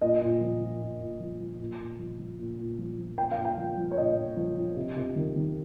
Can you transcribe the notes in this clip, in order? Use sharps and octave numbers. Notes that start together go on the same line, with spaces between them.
A#2 D#5
A#2
F3
F3
A#2
A#2
F3
F3
A#2
A#2
F3
F3
A#2
A#2
F3
F3
A#2 G5
F5
A#2
G5
F3
F3
C#5
A#2 D#5
A#2
F3
F3
C3
C3
D#3
D#3